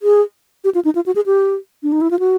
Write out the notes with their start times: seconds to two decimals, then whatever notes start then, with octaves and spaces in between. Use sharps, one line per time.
0.03 G#4
0.64 G4
0.75 F4
0.85 D#4
0.95 F4
1.06 F#4
1.16 G#4
1.26 G4
1.83 D4
1.92 D#4
2.01 E4
2.11 F4
2.19 F#4